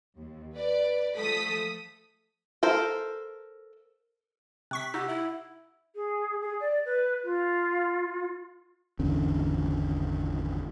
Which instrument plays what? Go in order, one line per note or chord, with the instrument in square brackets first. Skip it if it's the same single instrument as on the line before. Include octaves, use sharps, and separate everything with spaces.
[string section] D#2
B4 D5
F3 A3 A4 D#6 B6
[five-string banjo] A4 A#4 C5
[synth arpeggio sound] C3 C#6 B6 [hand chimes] F#6
[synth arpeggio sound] D#4 [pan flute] G4 [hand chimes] F#5 E6
[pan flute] E4 [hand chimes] E5
[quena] G#4
G#4
D5
B4
F4
[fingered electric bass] G#1 E2 D3 C#4